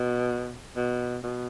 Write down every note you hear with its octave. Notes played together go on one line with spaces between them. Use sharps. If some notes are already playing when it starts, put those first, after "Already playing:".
Already playing: B2
B2
B2